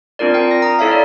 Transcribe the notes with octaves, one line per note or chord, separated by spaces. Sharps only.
C4 D4 F4 A#4 D5
A#4 G5
A#6
A#5 D#6
E4 A4 C#5 E5 F5
D5